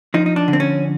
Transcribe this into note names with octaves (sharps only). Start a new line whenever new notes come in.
F3 D#4
D#4
D4
D3
C4
C#4